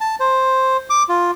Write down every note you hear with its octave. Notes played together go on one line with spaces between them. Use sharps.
A5
C5
D6
F4